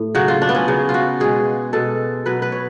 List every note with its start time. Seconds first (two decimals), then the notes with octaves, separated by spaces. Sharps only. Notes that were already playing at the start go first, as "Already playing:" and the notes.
Already playing: A2
0.15 C#3 F#3 F#4
0.28 F4
0.42 D4
0.49 B3
0.55 C#4
0.68 C#3 F#3
0.89 F4
0.94 F#4
1.20 B2 G#3 G#4
1.73 B2 G#3 A4
2.26 B2 F#3 B4
2.42 B4
2.52 C#5